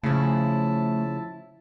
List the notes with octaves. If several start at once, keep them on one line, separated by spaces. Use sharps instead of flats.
C#3 F3 A3 E4 A5